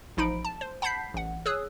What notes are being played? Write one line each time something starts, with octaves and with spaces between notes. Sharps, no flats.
A1 F3 D#4 B5 D7
A5
C5
F#5 A5 B5 G6 B6 C7
A1 F#5
G#4 C#5 D#6 E6 F#6